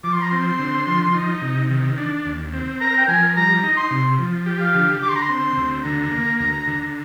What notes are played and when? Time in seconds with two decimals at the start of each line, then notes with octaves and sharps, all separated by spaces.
0.04 F3 D6
0.13 C6
0.22 A#5
0.30 C4 C6
0.59 D3
0.87 F3
1.14 D#4
1.42 C3
1.70 D#3
1.98 D4
2.25 D#2
2.53 C4
2.81 A#4 A#5
2.98 G5
3.08 F3 G#5
3.36 G3 A#5
3.63 D#4
3.77 C6
3.91 C3
4.19 F3
4.46 G4
4.60 F5
4.75 D3
5.01 D3 D6
5.09 C6
5.16 A#5
5.23 C6
5.29 C4
5.57 D2
5.84 D3 A#5
6.12 A#3
6.40 D2
6.67 D3